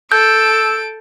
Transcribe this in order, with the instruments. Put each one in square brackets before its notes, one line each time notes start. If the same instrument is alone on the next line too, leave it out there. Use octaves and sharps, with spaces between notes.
[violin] A4 D7 [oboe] E6 [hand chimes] G6